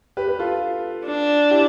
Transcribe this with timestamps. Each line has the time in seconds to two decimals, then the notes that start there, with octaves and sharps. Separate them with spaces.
0.17 G4 B4
0.28 B4
0.39 F4 A4
1.06 D4
1.51 E4 G4